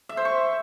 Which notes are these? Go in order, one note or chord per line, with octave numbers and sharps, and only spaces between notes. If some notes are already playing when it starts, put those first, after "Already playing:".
E5
C5
C#6